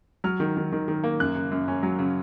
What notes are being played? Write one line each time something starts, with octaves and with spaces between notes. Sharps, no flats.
F#3 F6
D#3
D#3
D#3
D#3
A#3
F#2 F#6
C#3
F#2
C#4
F#3
C#3